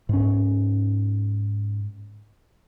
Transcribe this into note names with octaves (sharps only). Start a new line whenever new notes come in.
G#2 C#4